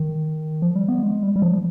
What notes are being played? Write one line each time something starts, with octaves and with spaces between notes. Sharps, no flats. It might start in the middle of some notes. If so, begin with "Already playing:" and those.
Already playing: D#3
F3
G3
B3
G#3
G3
G3
F3